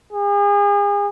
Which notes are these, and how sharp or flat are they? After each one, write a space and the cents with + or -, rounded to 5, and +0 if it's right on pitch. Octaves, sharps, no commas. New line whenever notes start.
G#4 -40